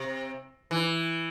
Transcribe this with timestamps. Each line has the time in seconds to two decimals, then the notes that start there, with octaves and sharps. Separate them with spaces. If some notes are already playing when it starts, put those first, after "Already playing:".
Already playing: C3
0.71 E3